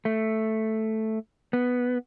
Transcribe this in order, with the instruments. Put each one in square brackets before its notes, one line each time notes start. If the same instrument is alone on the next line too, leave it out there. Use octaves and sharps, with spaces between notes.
[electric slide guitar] A3
B3